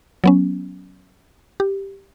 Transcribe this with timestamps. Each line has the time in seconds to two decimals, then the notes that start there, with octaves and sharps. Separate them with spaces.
0.24 F#3 B3 C#4
1.60 G4